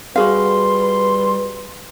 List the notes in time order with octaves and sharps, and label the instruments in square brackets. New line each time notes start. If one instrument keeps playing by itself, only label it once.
[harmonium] G3 [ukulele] F#4 G#4 F5 [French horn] B4 [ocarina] C6